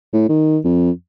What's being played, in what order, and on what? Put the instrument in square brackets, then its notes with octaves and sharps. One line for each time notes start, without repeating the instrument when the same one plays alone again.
[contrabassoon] A2
D#3
F2